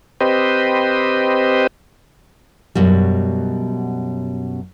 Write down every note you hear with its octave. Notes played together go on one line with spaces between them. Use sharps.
C4 G4 B4 C5 D#5
F#2 B2 G3